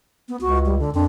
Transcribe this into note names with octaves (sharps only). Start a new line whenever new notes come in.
B3
C#2 F#4
G3
D3
F2 D4